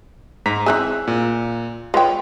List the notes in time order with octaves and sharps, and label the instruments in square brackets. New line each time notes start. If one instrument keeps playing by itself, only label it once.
[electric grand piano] G#2 A#5 B6
[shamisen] E3 C4 G#4 [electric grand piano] E5 E6 F#6
[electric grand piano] A#2
[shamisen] G#3 G5 [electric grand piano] F4 B4 C#5